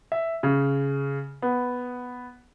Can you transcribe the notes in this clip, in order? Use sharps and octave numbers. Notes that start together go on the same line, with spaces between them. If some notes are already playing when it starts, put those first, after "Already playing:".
E5
C#3
B3